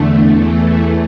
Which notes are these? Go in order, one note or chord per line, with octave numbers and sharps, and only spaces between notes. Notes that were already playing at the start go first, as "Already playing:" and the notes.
Already playing: E2 D3 A3
E2 E3 A3